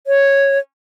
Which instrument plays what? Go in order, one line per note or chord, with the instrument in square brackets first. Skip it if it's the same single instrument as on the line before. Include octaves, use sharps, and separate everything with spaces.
[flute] C#5